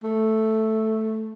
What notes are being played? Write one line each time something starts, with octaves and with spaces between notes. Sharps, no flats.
A3